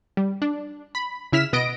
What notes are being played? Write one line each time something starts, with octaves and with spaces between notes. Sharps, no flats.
G3
D4
B5
C#3 E4 F6 B6 E7
B2 B3 D#5 A#6 D7